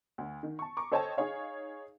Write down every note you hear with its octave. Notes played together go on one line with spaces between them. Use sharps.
D2
D#3
A5 C#6
A#5 C#6 D6
A4 C5 C#5 D#5 G5 A5
D#4 G#4 C#5 F5